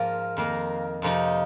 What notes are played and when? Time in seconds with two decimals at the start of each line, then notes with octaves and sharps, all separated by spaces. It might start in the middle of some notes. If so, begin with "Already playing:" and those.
Already playing: G#2 F3 A#3 F4 A#4
0.37 F2 D#3 A#3
1.02 F2 C3 F3 D#4